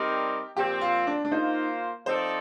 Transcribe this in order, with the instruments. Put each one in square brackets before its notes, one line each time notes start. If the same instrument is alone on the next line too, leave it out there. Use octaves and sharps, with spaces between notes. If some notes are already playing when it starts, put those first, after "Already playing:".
Already playing: [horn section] G3 C4 D#4 A#4 D5 [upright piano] G4
[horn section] A#2 F3 C4 [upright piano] G4
[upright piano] F4
D4
D4
[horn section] A#3 F4 C5 [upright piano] D#4
[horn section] F3 C4 D#4 A4 D5 [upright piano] C5